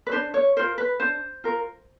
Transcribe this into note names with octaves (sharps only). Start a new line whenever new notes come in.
B4
D4 C5
C#5
F4 A#4 C5
B4
D4 C5
F4 A#4